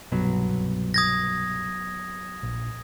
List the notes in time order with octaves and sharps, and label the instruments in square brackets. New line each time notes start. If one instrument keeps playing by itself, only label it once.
[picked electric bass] C2 G2 B2 [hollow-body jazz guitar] F#3 B3
[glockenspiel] D#6 G#6 A#6
[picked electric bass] A#1